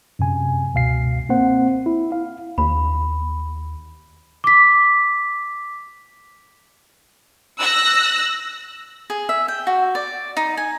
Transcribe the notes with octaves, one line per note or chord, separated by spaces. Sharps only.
F#2 C3 G#5
C#2 B2 F5 C7
A#3 C4 C5 F#5
E4
F5
D#2 B5
D6 B6
E6 F#6 A#6
G#4
E5
G5
F#4
D5
D#4
G#5